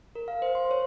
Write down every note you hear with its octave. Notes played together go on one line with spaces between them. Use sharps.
A#4
F5
C5
C6
C#5